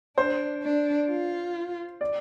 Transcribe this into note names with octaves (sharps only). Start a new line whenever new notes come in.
D4 C5
D4
F4
D5